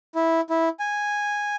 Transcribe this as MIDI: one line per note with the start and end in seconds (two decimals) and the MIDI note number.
0.15 0.41 64
0.50 0.69 64
0.80 1.56 80